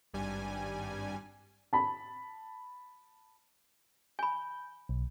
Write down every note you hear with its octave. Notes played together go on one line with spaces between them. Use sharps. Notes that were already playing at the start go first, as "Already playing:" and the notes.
G#1 G2 G3 G#5
A5 B5
G#5 B5 G6
B1